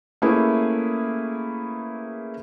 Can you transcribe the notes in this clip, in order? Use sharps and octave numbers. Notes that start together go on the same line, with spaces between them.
A3 A#3 C#4 E4 G#4 B4